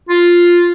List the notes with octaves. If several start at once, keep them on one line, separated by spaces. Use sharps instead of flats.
F4